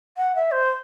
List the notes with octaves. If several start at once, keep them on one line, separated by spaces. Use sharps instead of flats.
F#5
E5
C5